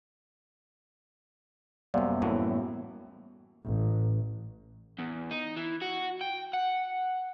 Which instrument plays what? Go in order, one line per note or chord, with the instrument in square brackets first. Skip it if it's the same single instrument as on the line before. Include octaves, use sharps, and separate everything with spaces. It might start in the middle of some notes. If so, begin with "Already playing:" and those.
[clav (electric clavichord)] F#2 C3 [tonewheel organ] G3 A#3 B3
[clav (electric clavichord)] F#2 A2 E3
[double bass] A1
[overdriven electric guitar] E2
D#4
E3
F#4
G5
F#5